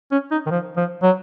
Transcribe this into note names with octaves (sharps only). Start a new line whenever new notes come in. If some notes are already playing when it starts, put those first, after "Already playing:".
C#4
D#4
D#3
F3
F3
F#3